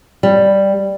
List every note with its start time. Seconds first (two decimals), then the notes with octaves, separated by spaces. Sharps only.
0.23 G3